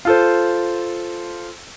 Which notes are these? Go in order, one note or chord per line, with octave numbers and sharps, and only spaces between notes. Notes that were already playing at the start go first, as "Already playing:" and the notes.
F4 A4 C5